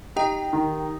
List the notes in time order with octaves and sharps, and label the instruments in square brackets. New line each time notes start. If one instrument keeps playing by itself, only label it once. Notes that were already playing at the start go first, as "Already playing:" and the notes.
[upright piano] D#4 [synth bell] G4 G5
[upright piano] D#3